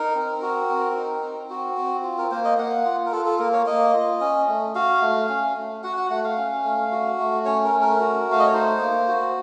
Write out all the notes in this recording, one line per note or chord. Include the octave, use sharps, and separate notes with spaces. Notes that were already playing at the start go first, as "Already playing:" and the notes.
Already playing: D#4 A#4
C4
F#4
C4
D#4
C4
F#4
C4
F4
A#4
A#3 C5
D#5
A#3 F#5
F4
A#4
F4 A4
A4
A#3 A#4
C#5
A#3 D#5
F4
C#4
A3
F#4 F5
A3
C#4
A3
F#4 F#5
F#5
A3 F#5
F5
C#4
A3
F#4
A3
C#4 C#5
A#4
A3
A#4
F#4
A3 F5
D#5
C#5
D#4 C5
A#3
F#4